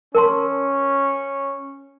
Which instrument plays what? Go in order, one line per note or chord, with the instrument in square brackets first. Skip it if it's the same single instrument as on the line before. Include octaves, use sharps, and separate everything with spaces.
[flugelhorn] C#4 [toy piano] A#4 A5 C6